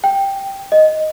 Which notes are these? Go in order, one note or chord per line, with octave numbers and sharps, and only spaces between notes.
G5
D#5